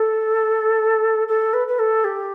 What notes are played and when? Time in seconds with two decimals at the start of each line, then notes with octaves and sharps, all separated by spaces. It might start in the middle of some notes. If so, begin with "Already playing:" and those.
Already playing: A4
1.28 A4
1.54 B4
1.68 B4
1.79 A4
2.04 G4